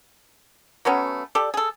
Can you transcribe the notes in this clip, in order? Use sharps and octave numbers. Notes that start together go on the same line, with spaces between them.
F#3 A3 B3 C#4
G4 A4 D5
G#4 A4